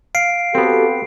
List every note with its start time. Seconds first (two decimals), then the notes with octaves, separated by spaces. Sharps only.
0.15 F5 C7 D7
0.55 B3 C4 F#4 G4 A4